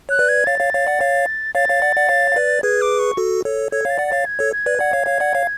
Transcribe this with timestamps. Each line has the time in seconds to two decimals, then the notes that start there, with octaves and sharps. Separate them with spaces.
0.09 C#5 F#6
0.19 B4 D5
0.29 G#6
0.46 C#5 F5 A6
0.60 C#5 F5
0.73 C#5 F5
0.87 D5 F#5
1.01 C#5 F5
1.55 C#5 F5 A6
1.68 C#5 F5
1.82 D5 F#5
1.96 D5 F#5
2.09 C#5 F5
2.32 F5
2.36 B4 D5
2.63 G#4 B4 G#6
2.81 D6
2.99 C#6
3.17 F#4 A4
3.45 A4 C#5
3.72 A4 C#5 G#6
3.85 C#5 F5 A6
3.98 D5 F#5
4.08 C#5 F5 A6
4.26 G#6
4.39 A4 C#5
4.53 G#6
4.66 B4 D5
4.80 D5 F#5
4.93 C#5 F5
5.07 C#5 F5
5.20 D5 F#5
5.35 C#5 F5